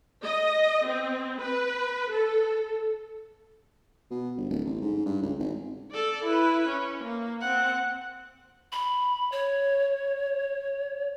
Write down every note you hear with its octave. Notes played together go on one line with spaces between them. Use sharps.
D#5
C4
B4
A4
B2
G1
D1
A1
G#2
G2
C#2
G#1
A4 D5
E4 B4
C#4
A#3
C4 F#5
B5
C#5